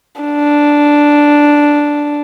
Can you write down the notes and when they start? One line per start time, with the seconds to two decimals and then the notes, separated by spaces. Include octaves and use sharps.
0.21 D4